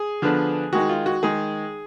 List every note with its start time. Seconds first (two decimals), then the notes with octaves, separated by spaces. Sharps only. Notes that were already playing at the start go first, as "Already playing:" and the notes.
Already playing: G#4
0.22 D3 F3 B3 D4
0.73 D#3 G#3 D#4 F#4
0.89 F4
1.06 F#4
1.22 D#3 G#3 D#4 G#4